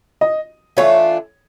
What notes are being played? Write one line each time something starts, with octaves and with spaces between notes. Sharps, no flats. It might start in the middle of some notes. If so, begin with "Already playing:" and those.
D#5
E3 A3 D4 F4 C#5